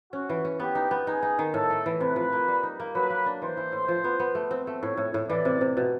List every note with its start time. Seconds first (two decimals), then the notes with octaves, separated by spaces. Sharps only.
0.13 C#4 F#4
0.29 E3
0.45 C#4
0.60 B3 G4
0.75 D#4
0.91 B3
1.07 D#4 G#4
1.23 D#4
1.39 D#3
1.53 A2 A4
1.70 A3
1.86 E3
2.00 C3 B4
2.16 F3
2.32 A#3
2.48 G3
2.63 D#4
2.80 A#3
2.95 F#3 B4
3.10 A#3
3.26 D4
3.41 E3 C5
3.57 E3
3.72 A2
3.88 F3
4.04 B3
4.20 B3
4.35 A3
4.51 C4
4.67 A3
4.82 A2 C#5
4.97 A2
5.14 A2
5.30 E3 D5
5.45 C3
5.61 C3
5.77 B2